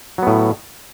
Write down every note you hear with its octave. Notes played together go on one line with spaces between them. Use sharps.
A2 F#3 B3